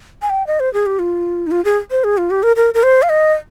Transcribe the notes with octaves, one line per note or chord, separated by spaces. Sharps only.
G#5
G5
D#5
C5
G#4
G4
F4
D#4
F4
G#4
C5
G#4
F4
G4
A#4
A#4
A#4
C5
F5
D#5